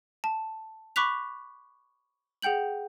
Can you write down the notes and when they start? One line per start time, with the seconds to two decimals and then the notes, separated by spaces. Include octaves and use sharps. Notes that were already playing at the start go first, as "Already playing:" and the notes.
0.24 A5
0.96 B5 C#6 D6 F#6 B6 F7
2.42 G#4 F#5 G5 G6 F#7